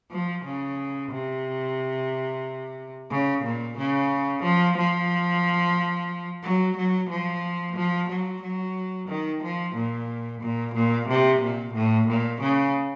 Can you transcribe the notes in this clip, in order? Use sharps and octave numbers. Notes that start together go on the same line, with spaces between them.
F3
C#3
C3
C#3
A#2
C#3
F3
F3
F#3
F#3
F3
F3
F#3
F#3
D#3
F3
A#2
A#2
A#2
C3
A#2
A2
A#2
C#3